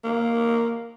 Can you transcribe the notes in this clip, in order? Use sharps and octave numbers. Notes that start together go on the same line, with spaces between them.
A#3